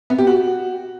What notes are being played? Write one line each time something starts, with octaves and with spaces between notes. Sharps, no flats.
B3
G4
F#4